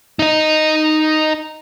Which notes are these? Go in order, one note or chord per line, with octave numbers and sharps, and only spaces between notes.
D#4 D#5